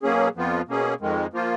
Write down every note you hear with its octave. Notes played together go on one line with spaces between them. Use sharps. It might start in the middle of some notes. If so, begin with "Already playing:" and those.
B2 F#3 A#3 C#4 G#4
F2 F3 B3 F4
B2 A#3 C#4 G#4
F2 D#3 G#3
F3 A#3 F4